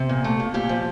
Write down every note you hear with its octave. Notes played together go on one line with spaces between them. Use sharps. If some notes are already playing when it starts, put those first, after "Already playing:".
Already playing: C3
A#2
A3
A#2
A#2 G3 G4
F3